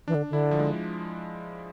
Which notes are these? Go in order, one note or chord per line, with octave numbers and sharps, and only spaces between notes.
E3 D4
D3
D3 E4
F3
G#3